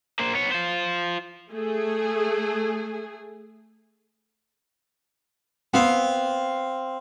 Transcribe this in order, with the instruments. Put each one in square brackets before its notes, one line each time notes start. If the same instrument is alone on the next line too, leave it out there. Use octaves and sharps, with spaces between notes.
[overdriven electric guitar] A#3 C5
B3 C#5
F4 C5
[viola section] A3 G#4
[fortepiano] B3 [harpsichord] C4 F5